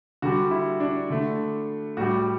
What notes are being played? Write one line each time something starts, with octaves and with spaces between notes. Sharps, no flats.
D3 G3 F#4
E4
D4
D3 A3
A2 G3 F#4